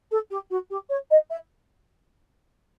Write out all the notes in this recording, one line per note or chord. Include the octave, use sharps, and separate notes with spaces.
A4
G4
F#4
G4
C#5
D#5
E5